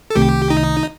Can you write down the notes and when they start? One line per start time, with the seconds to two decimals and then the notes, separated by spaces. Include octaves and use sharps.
0.10 A4
0.15 C2 C3 D#3 A3 G4
0.50 D#4